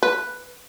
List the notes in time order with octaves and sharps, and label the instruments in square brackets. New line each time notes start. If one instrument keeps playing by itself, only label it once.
[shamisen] B4